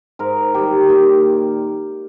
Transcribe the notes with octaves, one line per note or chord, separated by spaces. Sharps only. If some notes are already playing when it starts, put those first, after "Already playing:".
G#2 A#4
D#3 G3 G4
A#2